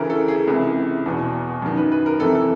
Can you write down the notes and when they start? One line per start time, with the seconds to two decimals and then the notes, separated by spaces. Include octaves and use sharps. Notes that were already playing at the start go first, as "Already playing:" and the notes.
Already playing: D2 C#3 E3 A#4
0.10 A4
0.28 G#4
0.47 C#2 C3 E3
1.06 E2 B2
1.62 F#2 D#3
1.77 B4
1.92 B4
2.06 A#4
2.20 F2 C3 E3 A4
2.35 A4